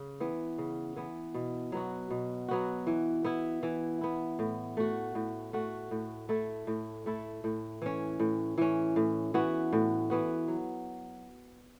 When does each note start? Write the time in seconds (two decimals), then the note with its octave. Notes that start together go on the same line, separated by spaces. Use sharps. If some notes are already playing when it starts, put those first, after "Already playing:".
Already playing: C#3
0.20 E3 B3
0.58 C#3
0.96 E3 B3
1.34 B2
1.72 F#3 B3 F#4
2.10 B2
2.48 F#3 B3 F#4
2.87 E3
3.24 B3 E4
3.63 E3
4.01 B3 E4
4.39 A2
4.77 A3 F#4
5.15 A2
5.53 A3 F#4
5.91 A2
6.29 A3 E4 A4
6.67 A2
7.06 A3 E4 A4
7.44 A2
7.82 E3 C#4
8.20 A2
8.58 E3 C#4
8.96 A2
9.34 E3 B3 F#4
9.73 A2
10.10 E3 B3 F#4
10.48 F#3